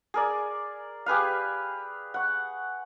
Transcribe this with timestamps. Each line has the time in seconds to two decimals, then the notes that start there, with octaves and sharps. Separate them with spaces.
0.14 G#4 A#4 D5
1.06 G4 G#4 B4 F5
2.14 F#5 C#6